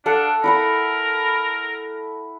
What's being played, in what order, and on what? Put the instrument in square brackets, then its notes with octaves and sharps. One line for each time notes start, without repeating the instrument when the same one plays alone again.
[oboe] D4 [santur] A4 F5 F#5
[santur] E4 F#5 B5 [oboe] A#4